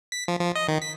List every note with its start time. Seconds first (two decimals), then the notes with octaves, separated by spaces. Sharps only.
0.12 B6
0.28 F3
0.40 F3
0.56 D#5
0.68 D#3
0.82 B6